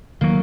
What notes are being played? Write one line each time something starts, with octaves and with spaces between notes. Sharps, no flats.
D#3 F#3 A#3